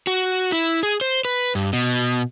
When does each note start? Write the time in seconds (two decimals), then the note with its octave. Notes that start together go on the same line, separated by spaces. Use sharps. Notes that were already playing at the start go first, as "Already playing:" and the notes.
0.07 F#4
0.52 E4
0.83 G#4
1.01 C5
1.25 B4
1.55 G2
1.73 B2